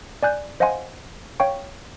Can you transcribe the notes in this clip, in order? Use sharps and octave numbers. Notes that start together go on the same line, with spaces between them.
D5 G#5 F#6 G6
C5 D#5 F5 F#5 G#5 C6
C#5 F5 G5 C#6